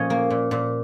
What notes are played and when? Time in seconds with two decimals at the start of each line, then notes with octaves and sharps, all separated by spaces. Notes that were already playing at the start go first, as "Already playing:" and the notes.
Already playing: A#2 F3 C#4 C#5 D#5
0.10 A#3
0.30 A#2
0.51 A#2